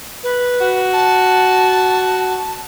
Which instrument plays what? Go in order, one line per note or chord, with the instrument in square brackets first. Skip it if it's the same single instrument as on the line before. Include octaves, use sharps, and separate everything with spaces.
[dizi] B4
[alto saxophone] F#4
[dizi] A5